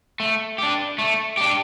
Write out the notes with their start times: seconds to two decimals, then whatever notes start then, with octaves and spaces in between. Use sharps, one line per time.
0.20 A3
0.58 D4 G4
0.98 A3
1.37 D4 G4